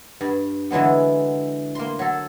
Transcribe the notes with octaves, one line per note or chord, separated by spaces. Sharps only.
G2
D3 E3 F#3 G#3 B3
A#3 C6
F#3 A4